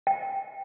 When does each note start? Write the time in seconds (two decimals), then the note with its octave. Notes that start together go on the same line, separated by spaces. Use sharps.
0.07 G5